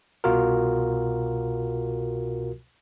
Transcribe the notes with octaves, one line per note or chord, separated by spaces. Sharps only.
C2 B2 F4 F#4 A#4